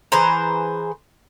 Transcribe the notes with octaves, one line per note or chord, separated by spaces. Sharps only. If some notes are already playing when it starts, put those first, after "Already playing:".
E3 G#4 C5 A#5